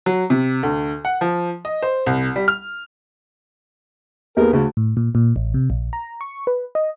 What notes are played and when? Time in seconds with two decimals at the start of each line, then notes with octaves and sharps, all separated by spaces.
0.06 F#3
0.30 C3
0.63 D2
1.05 F#5
1.21 F3
1.65 D#5
1.83 C5
2.06 C2
2.36 G3
2.48 F6
4.37 D#2 B3 G#4 A#4
4.53 D2 C#3
4.77 A2
4.97 A#2
5.15 A#2
5.36 A1
5.54 C3
5.70 A#1
5.93 A#5
6.21 C#6
6.47 B4
6.75 D#5